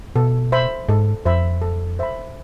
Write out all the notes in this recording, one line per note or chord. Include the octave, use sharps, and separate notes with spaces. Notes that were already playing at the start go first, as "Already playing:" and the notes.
B2 A4
C5 E5 B5
G#2 A4
F2 C5 E5 B5
A4
C5 E5 B5